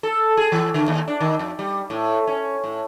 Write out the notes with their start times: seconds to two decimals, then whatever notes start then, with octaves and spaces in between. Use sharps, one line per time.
0.03 A4
0.37 G#4
0.52 E3
0.74 D3
0.88 D#2
1.08 D4
1.20 D#3
1.39 F2
1.59 G3
1.90 A2
2.27 C#4
2.64 A2